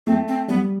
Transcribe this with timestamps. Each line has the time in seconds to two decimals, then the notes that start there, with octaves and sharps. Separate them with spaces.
0.07 A3 C4
0.28 C4
0.48 G3 B3